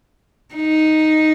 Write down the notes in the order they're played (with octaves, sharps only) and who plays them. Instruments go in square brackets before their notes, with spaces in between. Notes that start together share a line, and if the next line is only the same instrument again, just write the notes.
[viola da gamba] D#4